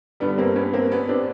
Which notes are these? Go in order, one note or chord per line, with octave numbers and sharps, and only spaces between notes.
G2 D3 G3 B3
A#3 C4
B3 C#4
A#3 C4
B3 C#4
C4 D4